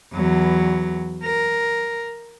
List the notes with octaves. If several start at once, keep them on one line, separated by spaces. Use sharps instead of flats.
E2 F#3
A#4